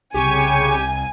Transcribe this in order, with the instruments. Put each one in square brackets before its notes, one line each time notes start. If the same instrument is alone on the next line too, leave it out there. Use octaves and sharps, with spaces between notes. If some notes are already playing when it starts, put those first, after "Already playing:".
[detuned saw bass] C2 [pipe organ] C#3 C#6 [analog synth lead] G4 [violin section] G#5